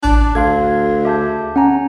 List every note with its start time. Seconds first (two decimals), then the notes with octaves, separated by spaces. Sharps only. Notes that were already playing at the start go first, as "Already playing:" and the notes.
0.03 A1 D4 F#6
0.35 D2 A4 F5 C6 G#6
1.05 G#4 E5 A5 D6 G6
1.56 C#4 F#5 G#5 A#5